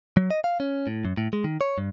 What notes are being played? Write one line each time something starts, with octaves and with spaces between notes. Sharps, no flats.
F#3
D#5
F5
C#4
A2
F#2
A2
G#3
D#3
C#5
G2